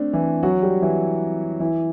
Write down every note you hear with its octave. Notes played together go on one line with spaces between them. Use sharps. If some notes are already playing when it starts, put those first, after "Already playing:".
Already playing: A3 C4 D4
E3 E4
F#3 F#4
G3 G4
E3 E4
E3 E4